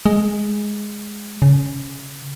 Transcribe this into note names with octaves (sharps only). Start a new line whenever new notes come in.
G#3
C#3